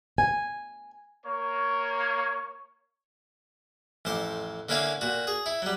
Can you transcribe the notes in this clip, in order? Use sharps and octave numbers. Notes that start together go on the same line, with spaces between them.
G#5
A#3 C#5
A1 F2 C5 D6
D3 A#3 C#4 E4 F5 G#5
A#2 F#4
G#4
E4
F#3 G3